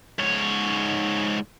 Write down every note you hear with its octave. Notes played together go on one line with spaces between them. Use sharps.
G#2 C#5